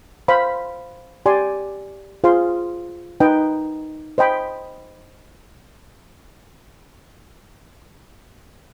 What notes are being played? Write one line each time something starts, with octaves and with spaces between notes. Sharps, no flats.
C5 F5 B5
G4 D5 G#5 C6
F4 G#4 C5 F5 C6
D#4 B4 D#5 G5
C5 D#5 G5 B5